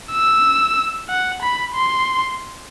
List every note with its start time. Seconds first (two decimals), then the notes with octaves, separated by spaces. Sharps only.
0.12 E6
1.09 F#5
1.42 B5
1.75 C6